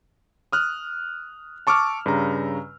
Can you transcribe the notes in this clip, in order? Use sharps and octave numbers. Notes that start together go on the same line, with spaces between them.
D#6 F6 F#6
A5 C#6 D6 E6 F6
G2 C#3 A#5